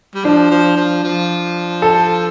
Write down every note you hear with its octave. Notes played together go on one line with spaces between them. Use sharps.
G3
F3 D4
F3
F3
F3
A4